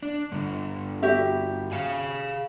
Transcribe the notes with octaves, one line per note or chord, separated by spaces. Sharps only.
D4
G2 D3
F#4 G4 E5
G#4 F5 G#5